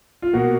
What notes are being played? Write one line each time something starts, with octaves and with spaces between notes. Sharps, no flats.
F4
B2 A#3 F#4